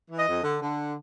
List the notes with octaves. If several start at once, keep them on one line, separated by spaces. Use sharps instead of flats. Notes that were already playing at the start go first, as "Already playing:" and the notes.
E3
D#5
F2
D3
D3